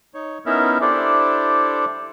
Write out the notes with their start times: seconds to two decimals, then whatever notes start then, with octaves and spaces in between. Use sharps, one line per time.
0.14 D#4 C#5
0.46 B3 C#4 D#4 E4 A#4 E5
0.81 D4 E4 G4 A4 C5 D5